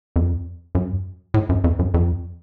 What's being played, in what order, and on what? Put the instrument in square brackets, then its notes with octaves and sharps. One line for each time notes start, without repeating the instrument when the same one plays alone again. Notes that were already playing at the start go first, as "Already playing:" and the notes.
[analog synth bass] F2
F#2
A2
F#2
F2
F#2
F2